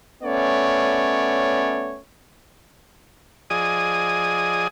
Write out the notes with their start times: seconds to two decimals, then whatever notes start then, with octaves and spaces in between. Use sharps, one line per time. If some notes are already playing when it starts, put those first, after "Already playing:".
0.23 A3 B3 C#4 C#5 D5
3.50 F3 G#4 D5 D#5 G#5 D#6